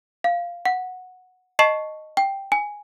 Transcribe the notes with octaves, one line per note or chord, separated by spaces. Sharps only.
F5
F#5
D#5 A5 C#6 C7 E7 F#7
G5
G#5